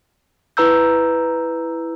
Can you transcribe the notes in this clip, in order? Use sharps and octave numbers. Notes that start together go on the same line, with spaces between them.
E4 B4 A#5 E6 G6